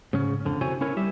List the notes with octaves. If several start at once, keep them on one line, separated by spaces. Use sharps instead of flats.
G#2 C#3 C#4
F2 D3
C3 E4 F#4 C5 C#5 G#5
C#4 E4 A#4 C#5
G3 G4 E5